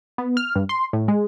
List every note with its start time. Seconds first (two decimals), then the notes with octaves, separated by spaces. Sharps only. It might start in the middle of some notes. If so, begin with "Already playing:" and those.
0.18 B3
0.37 F6
0.56 G2
0.69 C6
0.93 A2
1.08 G#3